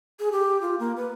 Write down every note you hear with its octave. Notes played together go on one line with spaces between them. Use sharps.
G#4
G4
F4
A#3
B4